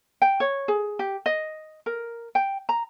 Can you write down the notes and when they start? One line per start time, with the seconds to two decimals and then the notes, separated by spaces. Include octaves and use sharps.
0.22 G5
0.40 C#5
0.68 G#4
0.99 G4
1.26 D#5
1.86 A#4
2.35 G5
2.69 A#5